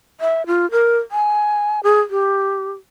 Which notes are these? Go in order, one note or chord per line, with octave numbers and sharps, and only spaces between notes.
E5
F4
A#4
G#5
G#4
G4